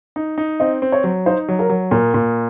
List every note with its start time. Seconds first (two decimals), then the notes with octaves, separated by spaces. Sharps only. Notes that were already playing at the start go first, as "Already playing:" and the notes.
0.16 D#4
0.38 D#4
0.60 C4 D#5
0.82 C4
0.92 C#5
1.04 F#3
1.26 D#4 C5
1.48 F#3
1.59 A#4
1.69 F#3
1.91 A#2 A#4
2.14 A#2